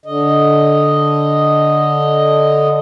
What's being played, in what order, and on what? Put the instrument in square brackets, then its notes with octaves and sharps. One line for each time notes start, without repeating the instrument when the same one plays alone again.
[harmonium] D3 D#5